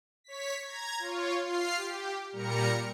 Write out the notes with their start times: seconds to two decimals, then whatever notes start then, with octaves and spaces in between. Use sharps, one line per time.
0.24 C#5 B6
0.63 A#5 G#6
0.99 F4 C#5
1.43 F4 F6 C7
1.76 G4
2.32 A#2 G3 A#4 A#5 C#7